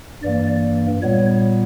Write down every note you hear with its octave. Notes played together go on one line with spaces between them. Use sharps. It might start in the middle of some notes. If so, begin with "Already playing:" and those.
G2 E3 A#3 D5
A#2 G3 B3 C#5